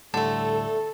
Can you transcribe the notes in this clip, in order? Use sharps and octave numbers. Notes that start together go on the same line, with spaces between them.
D2 A2 D3 G3 A3 A4 A5